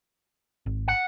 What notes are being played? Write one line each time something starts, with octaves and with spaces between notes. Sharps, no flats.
G#1
F#5